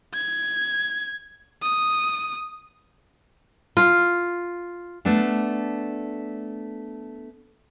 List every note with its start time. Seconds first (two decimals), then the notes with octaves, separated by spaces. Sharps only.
0.14 G#6
1.63 D#6
3.77 F4
5.05 A3 B3 D4